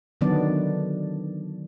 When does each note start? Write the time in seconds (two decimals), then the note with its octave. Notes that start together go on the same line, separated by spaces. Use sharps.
0.21 D3 D#3 F#3 B3 D4 D5